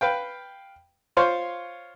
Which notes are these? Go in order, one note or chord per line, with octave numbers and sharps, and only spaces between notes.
B4 F5 G5
F4 C5 C#5 F5